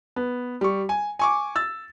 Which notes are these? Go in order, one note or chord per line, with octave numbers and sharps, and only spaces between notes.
B3
G3 C#6
G#5
G#5 C#6 D6
E6 A6